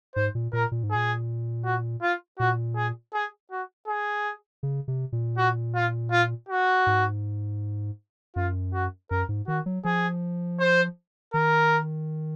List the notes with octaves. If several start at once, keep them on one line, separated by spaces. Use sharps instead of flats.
G#2 C5
A#2
A#2 A#4
A#2
G#2
A#2 G#4
F#4
F4
A#2 F#4
G#4
G#4
F#4
G#4
C#3
C3
A#2
F#4
F4
F4
F#4
G#2
F#2 F4
F#4
F#2 A#4
G#2
D#3 F#4
F#3
F3 G#4
C5
D#3 A#4